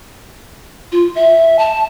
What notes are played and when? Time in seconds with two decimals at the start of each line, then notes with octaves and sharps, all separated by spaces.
0.92 F4
1.15 E5
1.59 A5